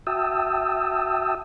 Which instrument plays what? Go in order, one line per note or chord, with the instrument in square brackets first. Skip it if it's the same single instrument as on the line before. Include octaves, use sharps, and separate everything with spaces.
[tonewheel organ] F#4 E5 G5 A5 D#6 E6